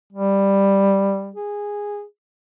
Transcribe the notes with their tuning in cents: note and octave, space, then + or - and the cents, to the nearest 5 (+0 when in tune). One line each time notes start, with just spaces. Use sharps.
G3 +5
G#4 -10